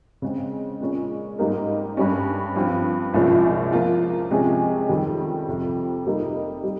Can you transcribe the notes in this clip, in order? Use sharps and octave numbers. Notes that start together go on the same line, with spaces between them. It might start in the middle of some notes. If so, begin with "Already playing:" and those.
C#3 G#3 C4
A#2 G#3 C#4
G#2 G3 A#3 D#4 A#4
G2 G3 C#4
G2 F3 C4 F4
C2 A#2 F3 G#3 C#4
F3 A#3 F4
C3 F3 G#3 C#4 G#4
F2 D#3 G3
F2 C3 F3
C3 G3 A#3 D#4 A#4
G3